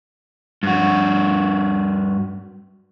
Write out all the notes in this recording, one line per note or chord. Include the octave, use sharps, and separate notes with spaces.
G2 F#4